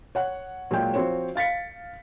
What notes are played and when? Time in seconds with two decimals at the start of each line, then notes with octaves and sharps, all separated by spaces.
0.15 C#5 F#5 F#6
0.71 A#2 F#3 G#3 G5
0.94 F3 C4 F#4 C5 C#5
1.36 F5 A6 B6 C#7